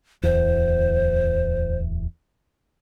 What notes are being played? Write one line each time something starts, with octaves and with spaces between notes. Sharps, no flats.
D1 E2 C5